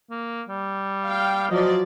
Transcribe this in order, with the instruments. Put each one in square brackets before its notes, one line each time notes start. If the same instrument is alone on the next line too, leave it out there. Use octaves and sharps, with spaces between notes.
[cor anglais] A#3
G3
[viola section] F5 G5
[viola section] F3 F#3 D5 [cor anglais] D#5